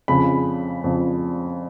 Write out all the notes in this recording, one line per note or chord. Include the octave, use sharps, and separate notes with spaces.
F2 C#3 B5
F2 C#3